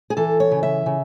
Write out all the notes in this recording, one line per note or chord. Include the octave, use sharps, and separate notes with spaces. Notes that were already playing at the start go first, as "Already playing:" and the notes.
G#4
E3 A4
C#5
C#3
E5
C#3